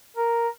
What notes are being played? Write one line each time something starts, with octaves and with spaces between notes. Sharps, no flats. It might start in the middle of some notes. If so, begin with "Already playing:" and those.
A#4